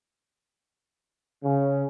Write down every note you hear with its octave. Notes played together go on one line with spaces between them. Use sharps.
C#3